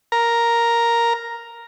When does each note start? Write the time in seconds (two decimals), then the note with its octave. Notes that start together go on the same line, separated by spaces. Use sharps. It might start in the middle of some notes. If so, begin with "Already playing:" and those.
0.12 A#4 A#5